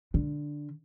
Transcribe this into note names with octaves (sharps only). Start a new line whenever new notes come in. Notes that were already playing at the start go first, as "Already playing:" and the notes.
D3